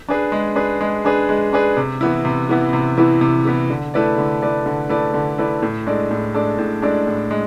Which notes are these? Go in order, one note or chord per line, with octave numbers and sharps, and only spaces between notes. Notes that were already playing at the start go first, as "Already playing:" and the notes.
D4 G#4 B4
G#3
D4 G#4 B4
G#3
D4 G#4 B4
G#3
D4 G#4 B4
C3
E3 B3 E4
C3
E3 B3 E4
C3
E3 B3 E4
C3
E3 B3 E4
D3
A3 E4 B4 D5
D3
A3 E4 B4 D5
D3
A3 E4 B4 D5
D3
A3 E4 B4 D5
A2
G#3 D4 A4 D5
A2
G#3 D4 A4 D5
A2
G#3 D4 A4 D5
A2
G#3